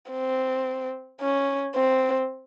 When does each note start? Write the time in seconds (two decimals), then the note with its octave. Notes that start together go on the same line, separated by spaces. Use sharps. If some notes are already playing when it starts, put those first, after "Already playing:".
0.10 C4
1.21 C#4
1.75 C4